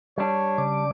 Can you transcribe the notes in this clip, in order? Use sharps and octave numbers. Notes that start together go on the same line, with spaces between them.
G3 D4 C#5
C#3 D5 D6